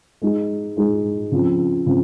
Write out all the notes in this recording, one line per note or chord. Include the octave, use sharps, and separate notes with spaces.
G#3 D#4 G#4
G#3 D#4 G#4
C#3 F3 C4
C#3 F3 C4